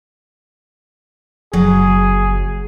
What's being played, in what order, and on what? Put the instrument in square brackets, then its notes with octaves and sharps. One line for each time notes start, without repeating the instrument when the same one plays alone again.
[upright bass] F#1 [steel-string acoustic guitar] F#3 [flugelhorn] G#4